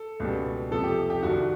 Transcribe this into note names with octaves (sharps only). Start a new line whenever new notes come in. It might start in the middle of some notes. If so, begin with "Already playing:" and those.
Already playing: A4
C#2 B2 G3
F2 C3 F3 A4
G4
G4
C2 C3 D#3 F#4